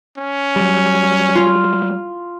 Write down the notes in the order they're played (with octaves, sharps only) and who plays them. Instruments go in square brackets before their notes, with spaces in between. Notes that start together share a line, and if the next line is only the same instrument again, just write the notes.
[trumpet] C#4
[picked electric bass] F#3 G3
[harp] F4